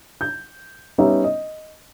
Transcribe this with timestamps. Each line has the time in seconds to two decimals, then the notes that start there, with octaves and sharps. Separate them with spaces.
0.21 G6
0.98 G3 B3 C#4 D#4 C#5 E5
1.24 D#5